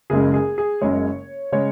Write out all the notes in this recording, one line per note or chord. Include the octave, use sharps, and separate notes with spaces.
F#1 F#2 C#3 G#3 G#4
G#4
G#4
F#1 F#2 C#3 G#3 C#5
C#3 G#3 C#5